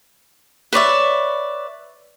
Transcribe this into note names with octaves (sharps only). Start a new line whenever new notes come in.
B4 C#5 D5 E5